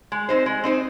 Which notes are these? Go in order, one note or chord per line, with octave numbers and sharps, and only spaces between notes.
G#3
C4 D#4 C5
G#3
C4 D#4 C5